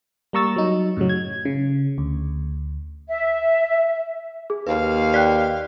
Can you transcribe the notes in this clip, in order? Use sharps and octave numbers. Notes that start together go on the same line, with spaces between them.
G3 A#3 A#5 C#6 E6 A6
F#3 D#4
F#2 A2 C#3 F#3
G#6
C#3
D2
E5
G#4
D#2 B4 F5
D5 G5 F#6 B6